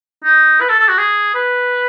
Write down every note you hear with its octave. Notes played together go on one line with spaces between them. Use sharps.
D#4
B4
A4
A4
F#4
G#4
B4